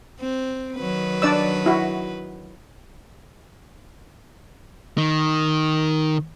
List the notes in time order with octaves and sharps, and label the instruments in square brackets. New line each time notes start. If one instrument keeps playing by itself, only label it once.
[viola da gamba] C4
D#3 F#3 B4
[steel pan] D4 D5 E6
E4 F#4
[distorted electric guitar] D#3